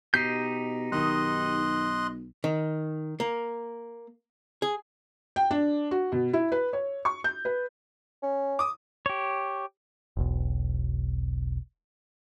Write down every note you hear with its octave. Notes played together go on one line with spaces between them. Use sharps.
B2 D#4 G4 G6 B6 C7
B1 D#3 D#5 C6 D#6 F#6
D#3
A#3
G#4
G5
D4
F#4
B2
E4
B4
C#5
C#6
G6
B4
C#4
D6 D#6
G4 C#5
E1 B1